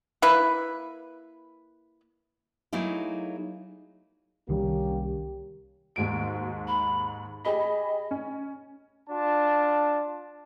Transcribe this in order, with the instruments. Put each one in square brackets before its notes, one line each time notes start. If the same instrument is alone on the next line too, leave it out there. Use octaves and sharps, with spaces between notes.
[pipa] A#3 E4 B4
[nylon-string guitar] F#3 A3 A#3 D#4 E4 G#4
[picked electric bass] C2 D#3 G3 [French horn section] A#3 C#4 G4
[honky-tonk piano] D#2 G#2 D7 [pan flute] F#4
[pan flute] B5
[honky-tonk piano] G4 G#4 B5 [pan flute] D#5
[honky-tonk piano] C#4
[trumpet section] D4 F4 A5